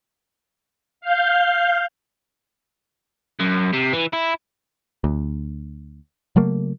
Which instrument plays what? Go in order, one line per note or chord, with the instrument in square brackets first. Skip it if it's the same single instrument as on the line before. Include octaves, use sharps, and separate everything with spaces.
[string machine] F5 G6
[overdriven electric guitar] F#2
C3
E3
E4
[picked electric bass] D2
C#3 F#3 A3 A#3